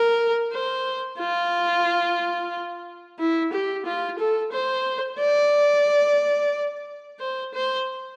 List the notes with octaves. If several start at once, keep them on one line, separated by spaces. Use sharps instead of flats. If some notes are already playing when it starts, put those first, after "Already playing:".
Already playing: A#4
C5
F4
E4
G4
F4
A4
C5
D5
C5
C5